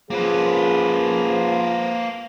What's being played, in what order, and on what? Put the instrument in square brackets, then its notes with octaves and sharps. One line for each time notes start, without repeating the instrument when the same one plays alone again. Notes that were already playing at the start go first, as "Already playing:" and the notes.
[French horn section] A#2 C#4 G#4 [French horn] F3 [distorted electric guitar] A#3 B4